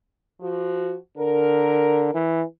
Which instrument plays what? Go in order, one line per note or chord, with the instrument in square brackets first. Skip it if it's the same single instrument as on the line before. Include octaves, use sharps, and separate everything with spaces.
[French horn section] F3 F#4
[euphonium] D3 [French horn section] A#4
[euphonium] E3